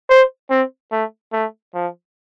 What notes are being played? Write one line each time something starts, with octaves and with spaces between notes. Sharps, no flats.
C5
C4
A3
A3
F3